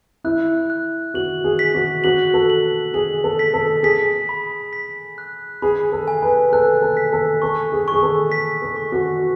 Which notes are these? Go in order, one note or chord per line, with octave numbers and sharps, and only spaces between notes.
E4 F#6
F#6
F#4 F#7
G#4
B6
F#4
F#4 F#7
A4
F#7
G#4 F#7
A4
B6
A4
G#4 B6
B5
B6
F#6
G#4 B5
A4
G#5
B4
A4 F#6
A4
B6
A4
A4 C#6
G#4
G#4 C#6
A4
B6
A4
C#6
F#4